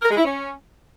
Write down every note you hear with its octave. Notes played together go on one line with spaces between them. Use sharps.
A#4
G#3
E4
C#4